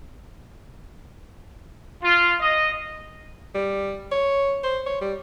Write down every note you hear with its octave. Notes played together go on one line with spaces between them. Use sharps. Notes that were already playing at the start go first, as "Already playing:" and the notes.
F4
D#5
G3
C#5
C5
C#5
G3